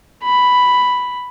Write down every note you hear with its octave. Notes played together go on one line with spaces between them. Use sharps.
B5